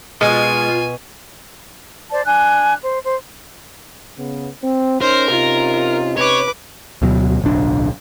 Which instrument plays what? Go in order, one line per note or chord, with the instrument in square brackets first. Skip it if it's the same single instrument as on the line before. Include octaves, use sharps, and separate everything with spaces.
[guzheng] B2 [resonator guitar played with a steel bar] G#3 [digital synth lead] F4 [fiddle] G#5
[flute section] C5 D5 A5
D4 G#5 F#6
C5
C5
[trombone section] C#3 B3
C4
[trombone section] C#4 D#4 [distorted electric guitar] A#4 [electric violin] C5
[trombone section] C3 C#4 D#4 [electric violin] F4
[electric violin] B4 D6 [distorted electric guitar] C#5
[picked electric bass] D2 B2 F#3
D1 B1 D4